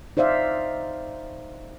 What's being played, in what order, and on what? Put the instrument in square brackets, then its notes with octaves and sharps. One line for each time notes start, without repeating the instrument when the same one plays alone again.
[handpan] D#4 C5 D5 E5 F5